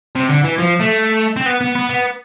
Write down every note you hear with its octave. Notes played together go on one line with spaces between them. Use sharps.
C3
D3
E3
F3
A3
C4
B3
B3
B3
B3